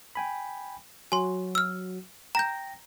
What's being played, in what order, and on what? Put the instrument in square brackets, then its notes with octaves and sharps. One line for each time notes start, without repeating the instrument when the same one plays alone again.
[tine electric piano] G5 G#5 B5
[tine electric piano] F#3 F#4 [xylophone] G#5 C6
[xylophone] E6 F6
[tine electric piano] G5 A#6 [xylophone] A#5 G6